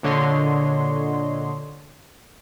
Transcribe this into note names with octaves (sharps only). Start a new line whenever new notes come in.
A#2 D3 C#5 D#5 C6